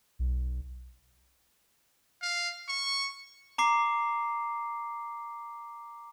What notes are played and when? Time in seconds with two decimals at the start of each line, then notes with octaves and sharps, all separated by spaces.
0.19 B1
2.22 F5
2.68 C#6
3.58 A#5 D6 C7